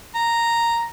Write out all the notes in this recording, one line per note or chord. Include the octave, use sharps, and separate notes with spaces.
A#5